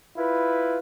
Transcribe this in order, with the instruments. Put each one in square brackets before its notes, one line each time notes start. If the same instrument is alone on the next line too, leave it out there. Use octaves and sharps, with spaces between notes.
[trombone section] E4 F4 B4